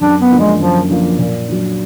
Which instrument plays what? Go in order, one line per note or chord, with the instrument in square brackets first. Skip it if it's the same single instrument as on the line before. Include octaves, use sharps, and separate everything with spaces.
[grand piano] F#2 [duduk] D4
[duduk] B3
[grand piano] D3 F3 A#3
[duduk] G#3
[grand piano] F#2 [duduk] F3
[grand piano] D3 F3 A#3
A#2
F#3 D4